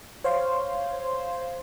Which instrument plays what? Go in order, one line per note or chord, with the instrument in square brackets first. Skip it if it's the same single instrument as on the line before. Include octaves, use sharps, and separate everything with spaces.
[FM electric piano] C5 C#5 F5 C6